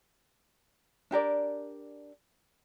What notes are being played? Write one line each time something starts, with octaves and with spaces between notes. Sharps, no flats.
D4 G4 A#4 D5